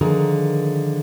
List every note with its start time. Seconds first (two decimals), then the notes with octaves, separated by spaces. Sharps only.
0.01 D3 D#3 F3 G#4 A#4